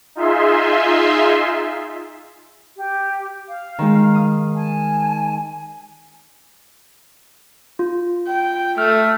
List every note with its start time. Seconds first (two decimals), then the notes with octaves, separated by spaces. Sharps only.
0.15 D#4 F4 G#4 E5 C6
2.76 G4
3.49 F5
3.79 D#3 G#3
4.15 D#6
4.55 G#5 A5
7.79 F4
8.27 G5
8.78 A3 F6